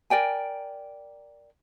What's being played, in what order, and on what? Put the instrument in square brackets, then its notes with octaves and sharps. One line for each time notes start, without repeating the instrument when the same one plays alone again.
[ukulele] A#4 D5 G5 G#5